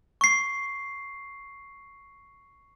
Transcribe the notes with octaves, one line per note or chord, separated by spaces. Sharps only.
C#6 C7